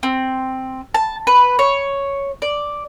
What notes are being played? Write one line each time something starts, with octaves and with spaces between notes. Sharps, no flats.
C4
A5
B4
C#5
D5